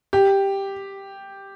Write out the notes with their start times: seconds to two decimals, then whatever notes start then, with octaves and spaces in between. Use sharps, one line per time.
0.13 G4